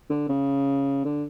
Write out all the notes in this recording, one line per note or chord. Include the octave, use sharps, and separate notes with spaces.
D3
C#3
D3